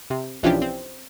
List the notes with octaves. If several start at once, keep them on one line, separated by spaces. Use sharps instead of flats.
C3
B1 E3 F3 C#4 D4 G4
C4